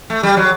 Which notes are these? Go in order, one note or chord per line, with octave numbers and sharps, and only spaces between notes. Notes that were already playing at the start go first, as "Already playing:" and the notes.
A3
G3
F#3